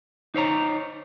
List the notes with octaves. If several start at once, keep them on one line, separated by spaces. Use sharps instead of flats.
D#4 C5 C#5 A#5